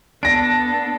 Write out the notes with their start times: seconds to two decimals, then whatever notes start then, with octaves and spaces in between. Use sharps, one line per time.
0.23 B3 D4 A4 A#6 D7